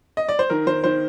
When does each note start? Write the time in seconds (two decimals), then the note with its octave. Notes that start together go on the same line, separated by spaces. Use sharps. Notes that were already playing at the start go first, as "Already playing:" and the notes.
0.17 D#5
0.29 D5
0.39 C5
0.50 D#3 A#4
0.67 D#3 C5
0.84 D#3 C5